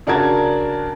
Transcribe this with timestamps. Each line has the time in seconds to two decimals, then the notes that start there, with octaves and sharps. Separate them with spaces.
0.07 C#3 D4 F#4 A#4 A5 G#6